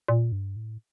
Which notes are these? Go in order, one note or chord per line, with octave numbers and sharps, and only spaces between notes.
A#2
G2
A2